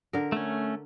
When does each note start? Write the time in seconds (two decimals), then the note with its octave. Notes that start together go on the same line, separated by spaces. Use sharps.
0.13 D3 A#4
0.32 A3 C#4